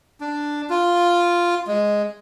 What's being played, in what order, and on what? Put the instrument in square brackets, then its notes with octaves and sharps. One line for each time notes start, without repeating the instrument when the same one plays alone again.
[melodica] D4
F4
G#3